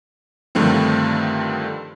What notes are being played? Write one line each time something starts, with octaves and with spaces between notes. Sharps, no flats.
G2 D3 D#3 F3 A3 C4